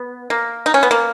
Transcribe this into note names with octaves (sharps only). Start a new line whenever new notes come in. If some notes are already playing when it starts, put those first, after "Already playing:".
Already playing: B3
A#3
D#4
C#4
B3
A#3